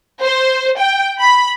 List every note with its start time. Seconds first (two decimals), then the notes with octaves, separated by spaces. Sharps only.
0.23 C5
0.79 G5
1.19 B5